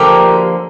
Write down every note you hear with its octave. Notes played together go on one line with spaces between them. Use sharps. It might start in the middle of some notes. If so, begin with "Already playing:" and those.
Already playing: D3 F3 A#3 G4 A#4